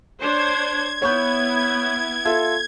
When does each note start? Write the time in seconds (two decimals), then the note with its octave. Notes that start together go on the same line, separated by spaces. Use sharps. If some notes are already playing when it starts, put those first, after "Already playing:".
0.20 D4 C5 C#5 G#6
1.02 B3 E4 C#5 C#6 G6 G#6
2.25 F4 A4 E5